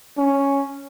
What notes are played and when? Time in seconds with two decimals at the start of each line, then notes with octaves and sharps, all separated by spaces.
0.18 C#4